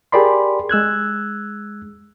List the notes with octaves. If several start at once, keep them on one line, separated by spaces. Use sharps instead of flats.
G4 G#4 A#4 D5 B5 C6
G#3 E6 F#6 G#6